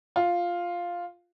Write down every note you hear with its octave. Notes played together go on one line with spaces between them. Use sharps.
F4